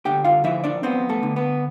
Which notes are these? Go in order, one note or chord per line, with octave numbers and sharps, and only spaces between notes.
D3 G4 G5
F4 F5
F3 E4 E5
D4 D5
B3 C4 C5
A3 A4
D3
B3 B4